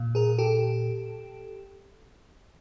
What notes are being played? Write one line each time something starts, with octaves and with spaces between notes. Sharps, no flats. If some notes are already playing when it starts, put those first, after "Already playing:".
Already playing: A#2
G#4 A#4
G4 A4